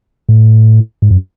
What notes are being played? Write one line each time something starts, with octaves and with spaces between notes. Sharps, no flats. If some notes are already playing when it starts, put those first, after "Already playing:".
A2
G#2
F#2